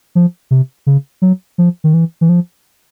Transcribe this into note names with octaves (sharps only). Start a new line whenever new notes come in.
F3
C3
C#3
F#3
F3
D#3
E3
E3
F3